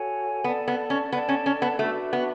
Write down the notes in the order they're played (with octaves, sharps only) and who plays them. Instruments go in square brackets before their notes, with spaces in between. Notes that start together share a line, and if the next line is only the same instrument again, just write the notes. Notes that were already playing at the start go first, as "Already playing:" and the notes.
Already playing: [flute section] F#4 A4 C#5 G#5
[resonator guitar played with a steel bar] B3 [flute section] A4 D5 A5
[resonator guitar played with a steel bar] B3
C#4
[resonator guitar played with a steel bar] B3 [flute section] A4 D5 A5
[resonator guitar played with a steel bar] C#4
C#4
B3
[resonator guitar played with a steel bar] A3 [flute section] D4 F#4 B4 E5
[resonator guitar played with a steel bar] B3